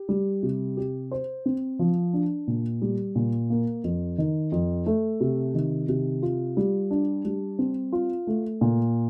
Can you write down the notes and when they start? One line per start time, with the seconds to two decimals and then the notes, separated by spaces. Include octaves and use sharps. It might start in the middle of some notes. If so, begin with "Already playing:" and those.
Already playing: G4
0.09 G3
0.43 C3
0.77 G4
1.11 C5
1.46 C4
1.79 F3
2.13 D4
2.47 A#2
2.82 G3
3.15 A#2
3.50 A#3
3.84 F2
4.18 D#3
4.52 F2
4.86 A3
5.20 C3
5.54 D#3
5.89 C3
6.22 F4
6.57 G3
6.91 D4
7.25 G3
7.59 C4
7.93 F4
8.27 A3
8.61 A#2